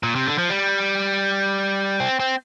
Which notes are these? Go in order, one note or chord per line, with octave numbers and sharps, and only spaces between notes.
A#2
C3
D3
F3
G3
C4
C4